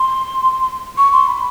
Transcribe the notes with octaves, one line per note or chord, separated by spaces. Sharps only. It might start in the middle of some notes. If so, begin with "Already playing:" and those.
Already playing: C6
C#6
C6
B5